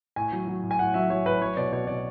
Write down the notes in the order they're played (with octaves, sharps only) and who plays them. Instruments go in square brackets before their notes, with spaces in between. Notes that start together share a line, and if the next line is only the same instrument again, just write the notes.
[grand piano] A2 G#5
F#3
F#3
A2
G#5
A2 F#5
F#3 E5
F#3 C#5
A2 B4
F#3 C#5
B2 D5
B2 C#5
B2 D5